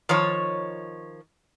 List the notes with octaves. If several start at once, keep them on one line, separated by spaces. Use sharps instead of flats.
D#3 F3 C#5